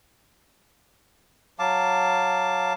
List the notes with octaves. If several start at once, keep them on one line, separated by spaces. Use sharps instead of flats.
F#3 F5 A5 D6